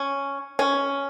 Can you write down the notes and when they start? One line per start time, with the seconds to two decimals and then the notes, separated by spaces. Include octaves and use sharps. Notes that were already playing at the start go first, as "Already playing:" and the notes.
Already playing: C#4
0.59 C#4